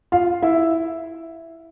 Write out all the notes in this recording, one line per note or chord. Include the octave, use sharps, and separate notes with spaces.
F4 F5
E4 E5